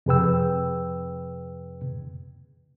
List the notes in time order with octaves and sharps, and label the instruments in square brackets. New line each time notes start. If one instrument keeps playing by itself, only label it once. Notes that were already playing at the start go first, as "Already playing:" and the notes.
[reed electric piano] F2 C3 G#4 B4 G5 E6